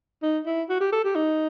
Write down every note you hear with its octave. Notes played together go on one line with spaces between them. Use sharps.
D#4
E4
F#4
G4
A4
G4
D#4